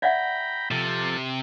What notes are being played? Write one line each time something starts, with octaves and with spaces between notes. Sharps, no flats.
D5 E5 F#5 G5 A#5 B5
C3 F3 A4